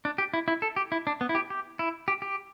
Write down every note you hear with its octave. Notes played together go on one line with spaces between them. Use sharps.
D4
G4
E4
E4
A4
G4
E4
D4
B3
E4
G4
G4
E4
G4
G4